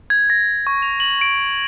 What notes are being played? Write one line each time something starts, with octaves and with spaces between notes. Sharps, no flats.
G#6
A#6
C#6
F7
F#7
D7